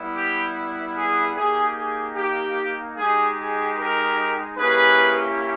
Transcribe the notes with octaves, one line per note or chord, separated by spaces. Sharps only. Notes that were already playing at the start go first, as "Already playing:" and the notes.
Already playing: G3 B3 E4
G4
G#4
A#3 D#4 G4 G#4
G#4
G4
G#3 D#4 G4 G#4
G#4
G4 A#4
A#3 C#4 E4 G4 G#4 B4